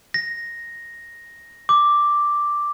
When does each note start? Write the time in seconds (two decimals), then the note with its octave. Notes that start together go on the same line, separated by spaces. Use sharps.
0.14 A#6
1.69 D6